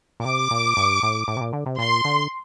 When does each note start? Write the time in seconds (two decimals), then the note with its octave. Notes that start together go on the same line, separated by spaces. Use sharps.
0.20 A#2
0.25 C3 D6
0.51 A#2
0.77 G2
1.03 A2
1.28 A2
1.37 C3
1.41 A#2
1.53 D3
1.66 C3
1.79 A#2 C6
2.05 D3